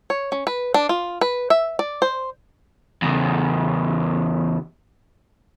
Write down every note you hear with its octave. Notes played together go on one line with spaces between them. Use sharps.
C#5
C#4
B4
D4
F4
B4
E5
D5
C5
E2 C#3